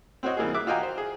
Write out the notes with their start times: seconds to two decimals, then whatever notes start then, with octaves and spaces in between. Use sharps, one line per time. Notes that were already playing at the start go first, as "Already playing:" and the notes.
0.23 C4 F#4 C5 C#5 D#5
0.37 E3 G3 A#3 D#4 G#4
0.54 E5 D6 F#6
0.67 F4 F#4 D#5 G5 G#5 A#5
0.83 C5
0.98 G#4